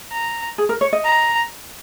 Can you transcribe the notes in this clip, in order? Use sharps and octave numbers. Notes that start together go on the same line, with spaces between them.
A#5
G#4
A#4
C#5
D#5
A#5